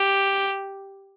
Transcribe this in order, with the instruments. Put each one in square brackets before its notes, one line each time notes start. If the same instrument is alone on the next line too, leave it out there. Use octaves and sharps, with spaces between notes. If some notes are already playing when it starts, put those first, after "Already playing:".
Already playing: [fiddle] G4